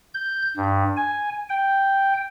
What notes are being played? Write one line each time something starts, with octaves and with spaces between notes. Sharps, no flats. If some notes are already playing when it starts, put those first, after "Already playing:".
G6
G2
G#5
G5